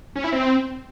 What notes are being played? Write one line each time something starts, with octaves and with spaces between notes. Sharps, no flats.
C#4
E4
C4